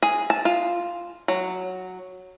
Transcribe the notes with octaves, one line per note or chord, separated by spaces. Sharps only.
G#4
A5
F4
F#3